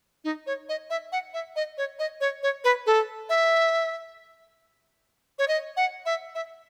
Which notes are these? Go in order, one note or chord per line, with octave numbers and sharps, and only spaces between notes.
D#4
C#5
D#5
E5
F#5
E5
D#5
C#5
D#5
C#5
C#5
B4
A4
E5
C#5
D#5
F#5
E5
E5